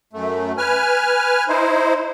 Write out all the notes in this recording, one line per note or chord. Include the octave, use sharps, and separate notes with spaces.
F#2 A3
B4 G#5 F6
D#4 E4 C5